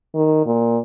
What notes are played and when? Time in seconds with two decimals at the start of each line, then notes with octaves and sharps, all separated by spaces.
0.15 D#3
0.46 A#2